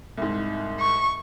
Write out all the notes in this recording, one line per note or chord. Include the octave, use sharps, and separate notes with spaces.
C2 G#2
C#6